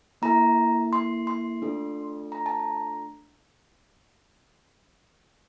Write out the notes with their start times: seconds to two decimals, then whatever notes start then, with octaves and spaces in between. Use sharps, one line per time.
0.22 A#3 E4 A4 A#5
0.93 C6
1.27 C6
1.62 A3 D4 F4 A4
2.32 A#5
2.46 A5
2.60 A#5